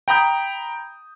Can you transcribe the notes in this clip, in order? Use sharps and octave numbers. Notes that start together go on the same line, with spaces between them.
G5 A#5 B5 D#6 G6